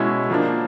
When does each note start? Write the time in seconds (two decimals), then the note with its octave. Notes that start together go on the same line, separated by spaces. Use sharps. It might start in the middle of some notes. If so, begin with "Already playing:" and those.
Already playing: B2 G#3 C#4 E4
0.30 F3 A#3 D4